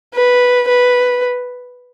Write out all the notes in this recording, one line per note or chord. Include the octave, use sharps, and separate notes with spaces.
B4
B4